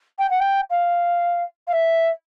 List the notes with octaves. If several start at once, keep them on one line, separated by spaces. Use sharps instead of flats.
G5
F#5
G5
F5
F5
E5